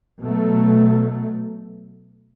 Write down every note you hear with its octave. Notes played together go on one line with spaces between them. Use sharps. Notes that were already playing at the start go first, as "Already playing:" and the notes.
B2 F#3 A3